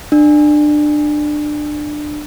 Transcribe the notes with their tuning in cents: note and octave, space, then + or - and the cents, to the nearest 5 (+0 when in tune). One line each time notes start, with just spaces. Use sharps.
D4 +25